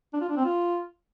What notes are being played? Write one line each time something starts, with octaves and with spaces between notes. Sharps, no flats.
D4
F4
D4
C4
F4